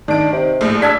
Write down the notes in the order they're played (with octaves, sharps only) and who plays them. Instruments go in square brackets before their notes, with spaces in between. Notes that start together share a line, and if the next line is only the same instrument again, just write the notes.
[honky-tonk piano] D#3 D7 [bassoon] D4
[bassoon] C3
[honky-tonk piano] A#1 A2
[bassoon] D4 [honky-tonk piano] E6 G#6 B6